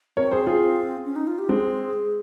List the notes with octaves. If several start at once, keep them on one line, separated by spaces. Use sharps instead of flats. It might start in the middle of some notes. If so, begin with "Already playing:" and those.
C4 A#4 C#5
G#4 C5
F4 G#4
C#4
D#4
F4
G4
G#3 C4 G#4